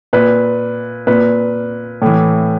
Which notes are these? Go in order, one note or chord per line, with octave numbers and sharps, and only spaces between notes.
A#2 B4
A#2 B4
A2 E3